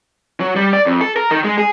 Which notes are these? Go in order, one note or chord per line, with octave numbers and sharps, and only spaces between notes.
F#3
G3
D5
F2
A4
A#4
D#3
G#3
G#4